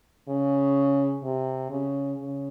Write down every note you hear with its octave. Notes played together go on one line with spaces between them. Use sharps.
C#3
C3
C#3
C#3